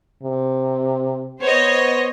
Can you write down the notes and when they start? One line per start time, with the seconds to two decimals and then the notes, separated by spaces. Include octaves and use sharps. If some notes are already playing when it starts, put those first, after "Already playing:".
0.23 C3
1.41 B3 C5 C#5 D#5